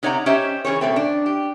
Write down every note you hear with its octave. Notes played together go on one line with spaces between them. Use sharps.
C3 D#4 C#5 D5 F#5 A#5
C#4 G4 C5 C#5 D#5 E5
E3 C#4 G#4 C#5
B2 A3 C4
D4
G4